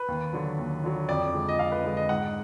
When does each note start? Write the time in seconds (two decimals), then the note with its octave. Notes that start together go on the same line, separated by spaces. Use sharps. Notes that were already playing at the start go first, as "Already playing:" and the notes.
Already playing: B4
0.08 D#2
0.33 D3 F#3
0.59 D#2
0.84 D3 F#3
1.09 F2 D5
1.33 D3 G#3
1.49 D#5
1.59 F2 F5
1.72 B4
1.84 D3 G#3
1.97 D#5
2.09 G#2 F#5